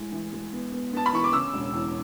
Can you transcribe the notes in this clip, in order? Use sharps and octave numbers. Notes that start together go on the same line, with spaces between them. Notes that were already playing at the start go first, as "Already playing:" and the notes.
Already playing: A2 G#3
E3
G#3
B3
B3
B3 A5
B5
E3 C#6
D6
C#3 E6
E1
E2